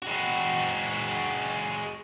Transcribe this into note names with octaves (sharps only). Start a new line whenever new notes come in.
G#3 F#4